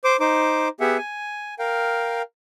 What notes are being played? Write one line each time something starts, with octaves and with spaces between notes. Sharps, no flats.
C5 D6
D#4 C5 D6
B3 G4 G#4 E5 F#5
G#5
A#4 F5 G5